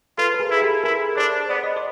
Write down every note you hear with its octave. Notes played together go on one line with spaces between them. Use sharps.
F4 A4 B4
B4
G#4 A#4
E4
G4 A4
E4 G#4 A#4
D4 C5 D5
B3 D5
D#5
C5 D5